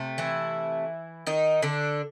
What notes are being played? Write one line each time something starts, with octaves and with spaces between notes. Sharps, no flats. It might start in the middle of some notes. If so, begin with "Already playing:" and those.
Already playing: C3 A3
E3 E4
D#3 D#4
D3 D4